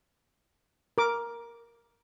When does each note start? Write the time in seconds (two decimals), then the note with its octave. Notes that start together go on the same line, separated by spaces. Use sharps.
0.98 A#4 D6